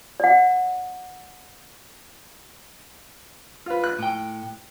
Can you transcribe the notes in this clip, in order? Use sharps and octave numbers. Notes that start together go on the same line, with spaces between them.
D5 F#5
F4 B4
F#6
A2 G5